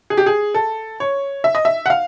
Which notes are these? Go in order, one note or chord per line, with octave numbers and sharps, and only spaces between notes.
G#4
G4
G#4
A4
C#5
E5
D#5
E5
F#5
F5